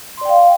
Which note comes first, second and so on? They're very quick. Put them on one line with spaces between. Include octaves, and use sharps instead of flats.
C6 D5 G5 F5